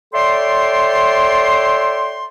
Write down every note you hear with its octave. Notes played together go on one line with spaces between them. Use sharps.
A4 C#5 D5 E5 G5 C6